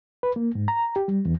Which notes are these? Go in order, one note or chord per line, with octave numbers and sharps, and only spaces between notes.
B4
A#3
G#2
A#5
G4
G3
E2